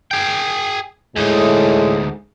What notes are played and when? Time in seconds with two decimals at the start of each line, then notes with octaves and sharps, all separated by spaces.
0.11 G#4 G5
1.16 D2 A2 G#3 D#4